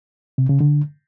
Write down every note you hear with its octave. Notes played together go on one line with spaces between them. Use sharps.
C3
C#3
D3